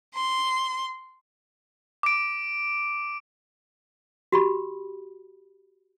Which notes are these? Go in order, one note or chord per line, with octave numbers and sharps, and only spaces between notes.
C6
D6 D7
F#4 G4 B5